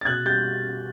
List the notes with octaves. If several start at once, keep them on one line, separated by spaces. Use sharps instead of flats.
A6
B2 F#6 G#6
G3 G6 A6